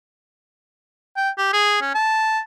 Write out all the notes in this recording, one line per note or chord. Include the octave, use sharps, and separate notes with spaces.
G5
G4
G#4
C#4
A5